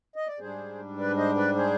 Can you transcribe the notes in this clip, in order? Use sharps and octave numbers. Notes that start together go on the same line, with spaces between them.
D#5
D5
G#2 G3 D4 G#4 C5
B4 D5
C5 D#5
B4 D5
G#4 C5